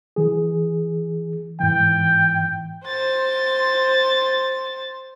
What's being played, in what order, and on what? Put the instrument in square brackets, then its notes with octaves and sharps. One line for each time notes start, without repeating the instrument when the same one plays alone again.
[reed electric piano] E3 G#4
[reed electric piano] G#2 E3 [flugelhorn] G5
[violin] C5 A6